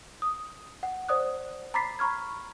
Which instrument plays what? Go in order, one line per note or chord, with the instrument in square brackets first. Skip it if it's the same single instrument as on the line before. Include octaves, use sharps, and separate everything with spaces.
[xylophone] D#6
F#5
C5 D5 D#6 F#6
A#5 B5 D6 A6 B6 C7
A#5 B5 C#6 F6 G#6